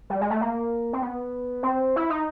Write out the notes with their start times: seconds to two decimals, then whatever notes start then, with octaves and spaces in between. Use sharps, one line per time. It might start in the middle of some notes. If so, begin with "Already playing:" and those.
0.10 G3
0.21 G#3
0.30 A3
0.41 A#3
0.93 C4
1.02 B3
1.63 C4
1.96 E4
2.10 D#4